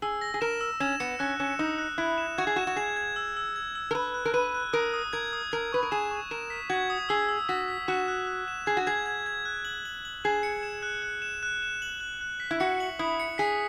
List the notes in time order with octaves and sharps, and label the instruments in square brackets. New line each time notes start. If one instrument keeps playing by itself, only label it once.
[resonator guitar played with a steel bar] G#4 [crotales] E6
[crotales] A#6
[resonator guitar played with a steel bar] G#4
[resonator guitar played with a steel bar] A#4 [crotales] E7
[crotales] E6
[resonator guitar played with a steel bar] C#4 [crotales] E7
[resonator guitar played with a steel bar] B3 [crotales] C#7
[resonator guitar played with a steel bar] C#4 [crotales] F#6
[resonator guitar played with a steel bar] C#4 [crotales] E7
[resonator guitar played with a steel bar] D#4 [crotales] D#6
[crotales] F#6
[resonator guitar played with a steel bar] E4 [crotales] F#6
[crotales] E7
[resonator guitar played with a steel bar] F#4 [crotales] G#6
[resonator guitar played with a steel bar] G#4
[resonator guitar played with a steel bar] F#4 [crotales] E7
[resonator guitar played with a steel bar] F#4
[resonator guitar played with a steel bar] G#4 [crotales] G#6
[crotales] G#6
E6
E6
G#6
E6
[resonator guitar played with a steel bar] A#4
[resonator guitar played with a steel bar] B4 [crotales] F#6
[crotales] F#6
[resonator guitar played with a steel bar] A#4
[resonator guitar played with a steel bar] B4 [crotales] D#7
[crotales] F#6
[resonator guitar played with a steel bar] A#4 [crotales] D#6
[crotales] D#6
[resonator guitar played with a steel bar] A#4 [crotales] G#6
[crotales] D#6
[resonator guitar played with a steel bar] A#4 [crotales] G#6
[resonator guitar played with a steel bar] B4 [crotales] C#6
[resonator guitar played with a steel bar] A#4
[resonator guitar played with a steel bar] G#4 [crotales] E7
[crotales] C#6
[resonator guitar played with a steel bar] A#4 [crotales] E7
[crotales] B6
[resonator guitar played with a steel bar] F#4 [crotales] G#6
[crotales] D#6
[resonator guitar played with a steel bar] G#4 [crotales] E6
[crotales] E6
[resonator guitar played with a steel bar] F#4 [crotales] B6
[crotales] B6
[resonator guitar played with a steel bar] F#4 [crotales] E7
[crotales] F#6
F#6
E7
[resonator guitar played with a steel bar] G#4 [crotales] G#6
[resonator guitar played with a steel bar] F#4
[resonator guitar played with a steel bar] G#4 [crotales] G#6
[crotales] G#6
G#6
F#6
F#7
F#7
F#7
[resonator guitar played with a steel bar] G#4 [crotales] E7
[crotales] C#7
E7
F#6
F#6
E7
F#6
E7
F#7
F#6
F#6
B6
[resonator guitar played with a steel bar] E4
[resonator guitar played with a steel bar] F#4 [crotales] C#7
[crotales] F#7
[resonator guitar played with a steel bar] E4 [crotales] D#6
[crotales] C#7
[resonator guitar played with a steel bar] G#4 [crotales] B6